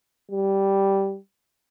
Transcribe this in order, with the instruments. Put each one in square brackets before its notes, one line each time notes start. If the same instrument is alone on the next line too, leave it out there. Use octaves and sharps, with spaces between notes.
[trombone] G3